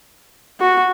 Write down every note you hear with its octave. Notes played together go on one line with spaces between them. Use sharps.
F#4